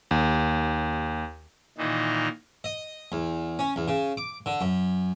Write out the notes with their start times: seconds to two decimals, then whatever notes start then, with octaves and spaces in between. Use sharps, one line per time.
0.11 D#2
1.78 A#2 D#3 E3 D#4
2.64 D#5
3.12 E2
3.59 C#4
3.76 E2
3.88 C#3
4.17 D6
4.46 D3
4.61 F#2